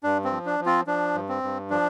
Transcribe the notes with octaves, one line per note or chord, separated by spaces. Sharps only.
G2 D4
C4
F3
D4
F3
C4 F4
F3 D4
G2
C4
G2
F3 D4